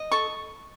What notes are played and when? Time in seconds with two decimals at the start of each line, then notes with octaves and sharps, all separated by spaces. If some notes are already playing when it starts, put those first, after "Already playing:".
Already playing: D#5
0.11 A4 C#6